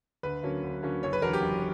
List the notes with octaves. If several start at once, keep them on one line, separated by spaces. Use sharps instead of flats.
D2 B4
D3 F#3 A#3 C#4
D2
D3 F#3 A#3 C#4
F#1 C#5
B4
E2 D3 F#3 A#4
G4
F#1